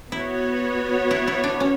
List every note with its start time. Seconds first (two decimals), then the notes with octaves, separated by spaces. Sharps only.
0.12 B3 E4 F#4 C#5
1.11 E4
1.27 E4
1.44 D4
1.60 C#4